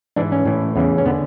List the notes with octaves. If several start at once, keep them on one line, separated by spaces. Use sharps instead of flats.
G#2 E3 D4
C#4
A2 E3
E2 C#3 E3
C#4
D3 B3